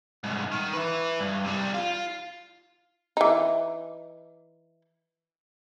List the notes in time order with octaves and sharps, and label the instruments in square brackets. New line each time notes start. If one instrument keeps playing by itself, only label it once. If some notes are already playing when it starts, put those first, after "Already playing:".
[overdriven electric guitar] C2 G#2
D#3
B4 E5
G2
C3 G3
F4
[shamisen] E3 D#4